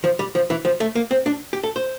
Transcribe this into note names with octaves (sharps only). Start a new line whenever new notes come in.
F3
G3
F3
E3
F3
A3
A#3
C4
D4
G4
A4
C5